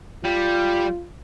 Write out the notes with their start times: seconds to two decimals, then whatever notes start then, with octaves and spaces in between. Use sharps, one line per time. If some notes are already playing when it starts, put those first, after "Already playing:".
0.24 G3 F4